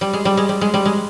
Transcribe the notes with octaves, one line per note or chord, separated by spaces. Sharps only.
G3
G#3
G3
G#3
G3
G#3
G3
G#3